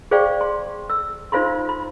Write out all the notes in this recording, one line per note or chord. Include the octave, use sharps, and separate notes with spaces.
G#4 C5 D5 F5 G5 C#6
C6
E6
D#4 F4 C5 F5 B5 C6
B5